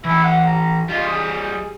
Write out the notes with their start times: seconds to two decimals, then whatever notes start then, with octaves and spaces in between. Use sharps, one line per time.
0.05 E3 E4 A4
0.23 F#5
0.46 A#5
0.89 G3 F4 D#5
1.08 G#4